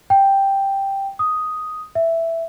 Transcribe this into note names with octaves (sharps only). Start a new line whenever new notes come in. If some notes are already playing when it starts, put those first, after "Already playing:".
G5
D#6
E5